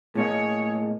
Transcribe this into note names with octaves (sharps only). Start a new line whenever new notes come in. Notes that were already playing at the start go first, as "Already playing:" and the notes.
A2 A#3 G#4 C#5 D#5